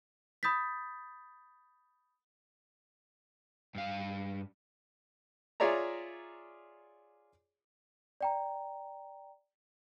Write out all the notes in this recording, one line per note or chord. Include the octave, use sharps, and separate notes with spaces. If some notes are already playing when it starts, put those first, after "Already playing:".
B5 D#6 G6 A6 B6
G2 F5
F4 G#4 C#5 D5 E5 A#5
D5 G5 A#5